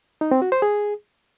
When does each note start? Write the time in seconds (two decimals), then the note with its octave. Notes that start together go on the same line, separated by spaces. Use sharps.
0.21 D#4
0.31 C4
0.42 F#4
0.52 C5
0.62 G#4